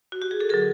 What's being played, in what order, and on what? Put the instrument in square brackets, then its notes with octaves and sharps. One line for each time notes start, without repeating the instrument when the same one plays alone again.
[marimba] F#4
G4
G#4
A4
D3 F#3 G#4 A#4